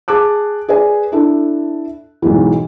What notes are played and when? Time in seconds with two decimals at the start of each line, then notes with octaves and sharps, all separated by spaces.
0.08 G#4 A5 D6 F#6
0.68 G#4 B4 D5 G#5
1.12 D4 E4 A4
2.22 B1 G#2 E3